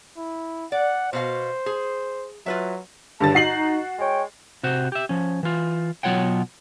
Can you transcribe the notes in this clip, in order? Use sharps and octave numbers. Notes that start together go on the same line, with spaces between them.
E4
D5 F#5
B2 F#4 C5 F5
G#4
F#3 F4 B4 E5
C#2 G2 D3 A5 A6
D#4 F#4 C7 F#7
G#3 C#5 G5
C3 F#4 C5
G4 E5
F3 C#4
E3 F4
B2 F#3 F4 C#5 F#5 G5